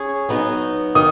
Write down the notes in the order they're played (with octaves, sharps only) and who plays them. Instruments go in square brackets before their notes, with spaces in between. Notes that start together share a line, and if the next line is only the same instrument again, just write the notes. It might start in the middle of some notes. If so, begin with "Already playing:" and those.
Already playing: [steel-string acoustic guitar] C#4 G#4
F#3 B3 D#4
[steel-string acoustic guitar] D#3 [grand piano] D#6